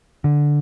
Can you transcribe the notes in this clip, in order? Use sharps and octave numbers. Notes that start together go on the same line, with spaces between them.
D3